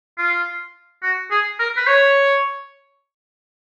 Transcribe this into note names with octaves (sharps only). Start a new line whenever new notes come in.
F4
F#4
G#4
A#4
B4
C#5